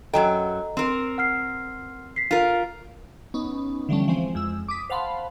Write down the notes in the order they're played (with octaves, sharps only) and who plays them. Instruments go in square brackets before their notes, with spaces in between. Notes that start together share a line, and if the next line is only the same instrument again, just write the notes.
[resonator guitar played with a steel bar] F#2 F#3 G5 [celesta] A4 D#5 A#5
[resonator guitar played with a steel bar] C4 A#4
[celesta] F#5 F6 C7
B6 C7
[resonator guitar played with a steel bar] F4 A#4
[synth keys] B3 C#4 D#4
D3 E3 F3 G3 A3 C#4
E3 F3 G#3 C4 C5
F2 G#3 E6
D6 D#6 B6
C5 F5 F#5 A5 B5 C6